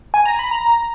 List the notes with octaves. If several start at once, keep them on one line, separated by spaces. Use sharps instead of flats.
G#5
A#5
B5
A#5